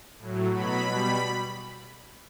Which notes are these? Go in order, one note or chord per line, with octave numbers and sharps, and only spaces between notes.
A2 F#3
B2 F#3 B5
B2 G3 B5